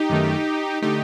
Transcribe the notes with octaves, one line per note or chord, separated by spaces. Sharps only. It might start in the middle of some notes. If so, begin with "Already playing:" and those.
Already playing: D#4 G4
F#2 D#3 A3
D3 A3 D#4 G4